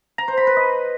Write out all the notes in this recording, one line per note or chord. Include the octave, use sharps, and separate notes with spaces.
A#5
C5
B5
B4
D#5